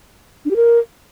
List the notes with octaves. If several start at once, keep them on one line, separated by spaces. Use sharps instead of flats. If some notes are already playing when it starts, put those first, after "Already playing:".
D4
G4
A#4